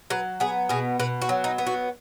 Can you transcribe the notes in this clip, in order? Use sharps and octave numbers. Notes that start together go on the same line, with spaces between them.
F#3 B4
B3 G#4
B2 G#4
B2 B4
F#4
F#3
D#4
B3
F#4